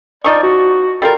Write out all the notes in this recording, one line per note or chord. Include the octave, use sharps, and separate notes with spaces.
F3 D#4 D5 C#6
F#4
G3 F4 A4 A#4